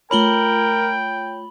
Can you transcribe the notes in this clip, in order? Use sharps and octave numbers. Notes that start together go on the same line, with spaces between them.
A3 F4 A#4 C#5 G5 B5 F#7 G7